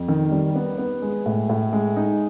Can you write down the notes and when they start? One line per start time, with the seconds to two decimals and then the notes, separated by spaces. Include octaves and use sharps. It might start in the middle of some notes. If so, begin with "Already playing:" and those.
Already playing: F2
0.08 D#3
0.31 G3
0.56 B3
0.78 B3
1.02 G#3
1.26 A2
1.49 A2
1.73 G#3
1.96 D#4